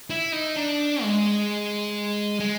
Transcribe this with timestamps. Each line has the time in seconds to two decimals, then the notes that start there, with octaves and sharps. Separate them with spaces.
0.10 E4
0.32 D#4
0.56 D4
1.02 G#3
2.40 G#3